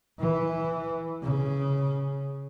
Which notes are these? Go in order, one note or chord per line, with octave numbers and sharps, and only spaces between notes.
E3
C#3